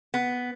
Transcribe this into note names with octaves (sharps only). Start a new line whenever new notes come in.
B3